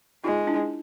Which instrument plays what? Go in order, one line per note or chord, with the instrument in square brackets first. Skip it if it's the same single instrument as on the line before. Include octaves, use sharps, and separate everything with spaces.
[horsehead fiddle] G#3 [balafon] D#4 F4
[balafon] D4 E4